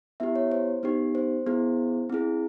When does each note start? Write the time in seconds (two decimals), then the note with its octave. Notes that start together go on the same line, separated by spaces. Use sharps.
0.20 B3 E4 G4 E5
0.36 C#5
0.52 C5
0.83 B3 D#4 G4
1.15 C5
1.47 B3 E4 G#4
2.10 C4 E4 G#4